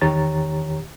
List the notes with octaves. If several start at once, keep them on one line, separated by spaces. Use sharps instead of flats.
E2 D#3 G4 C#5 A#5 A6